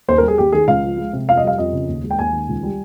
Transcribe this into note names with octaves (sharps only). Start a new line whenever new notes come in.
D#2 C5
A#4
G3 G#4
D#2 G4
D#3 G#4
C#2 F5
F3
G#3
C3
F2 F5
D#5
G3 F5
F2 D#5
C#3
D#2
G#3
G5
D#2 G#5
D#3
C#2
G3